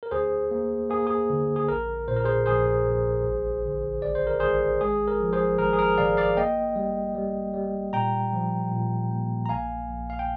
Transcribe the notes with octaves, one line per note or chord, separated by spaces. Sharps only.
A#4
D2 G#4 C5
A#3
A#3 G#4
G#4
D3
G#4
A#1 A#4
A#2 C5
A#4
G#4 C5
A#1 G#4 C5
A#1
G#1
D3
G#1 D5
C5
A#4
G#1 G#4 C5
G#3 G#4
A#4
F3
G#4 C5
G#1 A#4
G#4
A#4
G#1 D5 F5
D5 F5
A#3 D#5 G5
G3
G3
G3
A#2 G5 A#5
F3
A#2
A#3
A#5
A#1 F5 G#5
A#1
F5
G5